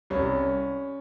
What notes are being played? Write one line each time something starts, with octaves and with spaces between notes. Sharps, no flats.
C2 C#4